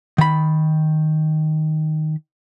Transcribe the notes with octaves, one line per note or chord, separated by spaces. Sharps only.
D#3 B5